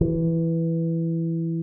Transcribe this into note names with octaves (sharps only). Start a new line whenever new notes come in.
E3